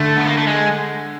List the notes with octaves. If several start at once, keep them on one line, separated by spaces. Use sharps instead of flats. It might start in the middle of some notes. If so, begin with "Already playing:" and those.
Already playing: D3 A3
B3
A#3
A3
G#3